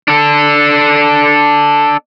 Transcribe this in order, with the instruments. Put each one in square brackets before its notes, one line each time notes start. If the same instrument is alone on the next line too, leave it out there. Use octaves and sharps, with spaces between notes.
[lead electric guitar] D4 A4